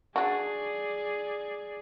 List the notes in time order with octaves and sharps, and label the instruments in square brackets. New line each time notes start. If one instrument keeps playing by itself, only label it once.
[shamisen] D4 F#4 [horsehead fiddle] G#4 D5